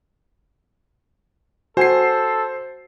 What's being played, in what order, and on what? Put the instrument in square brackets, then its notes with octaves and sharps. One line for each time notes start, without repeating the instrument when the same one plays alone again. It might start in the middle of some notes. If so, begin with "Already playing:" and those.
[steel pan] F#4 G#5 [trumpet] A4 [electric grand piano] C5 C7